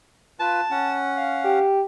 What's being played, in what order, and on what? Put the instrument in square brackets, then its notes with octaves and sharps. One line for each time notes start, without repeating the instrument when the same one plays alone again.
[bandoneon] F4 B4 [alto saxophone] A5
[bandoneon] C#4 F#5
[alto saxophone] F5
[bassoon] G4